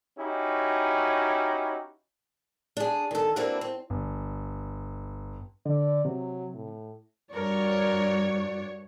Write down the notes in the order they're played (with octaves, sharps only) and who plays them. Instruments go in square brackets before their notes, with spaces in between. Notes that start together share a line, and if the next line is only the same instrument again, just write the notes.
[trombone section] C#4 D#4 E4 F#4 G4
[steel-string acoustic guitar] D4 G#4
D#3 A4
A#3 C4 D4 E4 F#4 B4
C4
[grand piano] G1
[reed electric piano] D3 [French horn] D5
[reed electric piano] C3 [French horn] F#3
[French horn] A2
[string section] G2 C#5 [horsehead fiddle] F#4 D5 [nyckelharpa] A#4